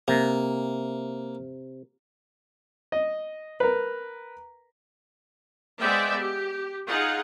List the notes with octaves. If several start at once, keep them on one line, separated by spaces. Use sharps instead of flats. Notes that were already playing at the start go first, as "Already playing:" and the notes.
C3 A#3
D#5
A#4 B4
G#3 B3 C5 D5 E5 G5
G4
D#4 F4 G#4 F#5